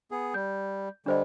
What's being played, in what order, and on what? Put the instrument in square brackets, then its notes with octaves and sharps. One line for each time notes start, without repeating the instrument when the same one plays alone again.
[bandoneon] B3 G#4
[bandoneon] G3 [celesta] G6
[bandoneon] D3 G3 [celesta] D4 C5 D#5